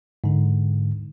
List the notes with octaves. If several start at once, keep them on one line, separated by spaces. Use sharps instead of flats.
G#2 D3